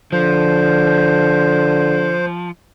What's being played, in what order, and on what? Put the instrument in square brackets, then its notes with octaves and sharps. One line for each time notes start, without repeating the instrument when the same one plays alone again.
[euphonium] D3 [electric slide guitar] F3 [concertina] C5